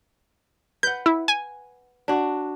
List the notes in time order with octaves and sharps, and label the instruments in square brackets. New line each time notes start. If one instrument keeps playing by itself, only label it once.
[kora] B4 F#5 [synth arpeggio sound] G6
[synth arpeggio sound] E4
G#5
[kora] D4 F#4